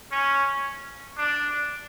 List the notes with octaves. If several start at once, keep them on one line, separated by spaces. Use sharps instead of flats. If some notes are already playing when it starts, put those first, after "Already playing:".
C#4
D4